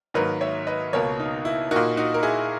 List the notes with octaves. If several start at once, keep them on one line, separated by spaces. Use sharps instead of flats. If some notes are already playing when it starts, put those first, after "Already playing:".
G#2 D#3 F#3 A#3 B4 D#5
C#5 E5
B4 D#5
C#2 B2 A#3 A#4 C#5
D#4
E4
A#2 A#3 D#4 F#4
D#4 F#4
A#4
E4 G#4